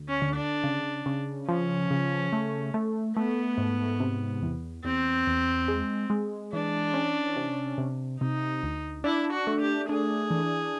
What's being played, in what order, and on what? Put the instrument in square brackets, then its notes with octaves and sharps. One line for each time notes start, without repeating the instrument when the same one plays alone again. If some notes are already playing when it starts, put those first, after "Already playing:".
Already playing: [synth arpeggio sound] D2
[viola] C#4
[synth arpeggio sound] D3
[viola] D4
[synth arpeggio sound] C#3
C#3
[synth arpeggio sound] F3 [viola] C#4
[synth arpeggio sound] C#3
A3
A3
[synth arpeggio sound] A3 [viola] B3
[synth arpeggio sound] G#2
C3
E2
[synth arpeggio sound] E2 [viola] C4
[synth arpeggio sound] E2
G#3
G#3
[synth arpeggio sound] E3 [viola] D4
[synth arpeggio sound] C#4
C3
C3
[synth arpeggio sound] C3 [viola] D#4
[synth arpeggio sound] D2
[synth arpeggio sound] D4 [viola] E4
[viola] F#4
[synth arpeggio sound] A3
[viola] G4
[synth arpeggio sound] D4 [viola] G#4
[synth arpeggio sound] E3